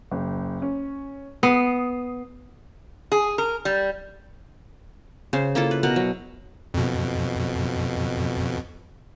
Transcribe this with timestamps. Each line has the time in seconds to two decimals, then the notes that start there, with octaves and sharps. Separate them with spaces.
0.11 F#1
0.62 C#4
1.43 B3 D#6 C7
3.12 G#4
3.38 A#4
3.65 G3
5.33 C#3 C5
5.55 A#3 E4 F4 A4
5.71 B4
5.83 B2 A#4 F#5
5.96 F#3
6.74 F2 B2